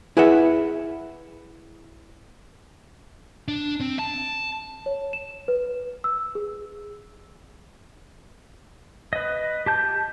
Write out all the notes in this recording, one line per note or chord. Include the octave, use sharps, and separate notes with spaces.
E4 G#4 B4 E5 F#5
D4
C4
A5
C#5
E7
B4
E6
G#4
B4 D#5
G4 A5 G6